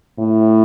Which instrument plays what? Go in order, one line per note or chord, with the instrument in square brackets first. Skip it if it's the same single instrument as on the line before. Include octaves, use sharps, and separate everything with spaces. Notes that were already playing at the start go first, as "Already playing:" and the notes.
[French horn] A2